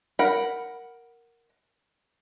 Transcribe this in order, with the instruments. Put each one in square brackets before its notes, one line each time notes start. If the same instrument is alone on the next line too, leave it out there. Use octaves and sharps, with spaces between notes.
[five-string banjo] A#4 F#5 B5